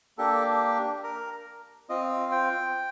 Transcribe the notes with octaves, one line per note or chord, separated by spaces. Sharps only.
A#3 D4 G4 A4
A#4
C4 F4 D#5
G5